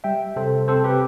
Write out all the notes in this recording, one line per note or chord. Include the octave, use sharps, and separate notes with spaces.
G3 E5 G5
C3 A4 C5
C4 A4 C5
G4 B4